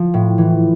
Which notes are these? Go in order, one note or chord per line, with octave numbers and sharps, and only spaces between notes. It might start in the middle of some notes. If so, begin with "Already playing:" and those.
Already playing: F3
A2
E3